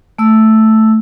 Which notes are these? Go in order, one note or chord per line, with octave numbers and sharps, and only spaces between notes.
A3 E6